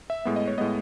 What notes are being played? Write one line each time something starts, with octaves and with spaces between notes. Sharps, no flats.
E5
A2 G#3 B3
D#5
C#5
A2 G#3 B3 D#5